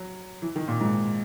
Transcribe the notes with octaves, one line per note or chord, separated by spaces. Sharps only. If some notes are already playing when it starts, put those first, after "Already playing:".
Already playing: F#3
E3
D#3
A#2
G#2